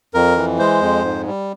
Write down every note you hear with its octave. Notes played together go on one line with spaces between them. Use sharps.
F2 A#4
E3
G#3 C5
F2
G#2
G3